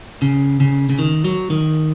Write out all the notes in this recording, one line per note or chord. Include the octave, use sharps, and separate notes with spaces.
C#3
C#3
C#3
D#3
F#3
D#3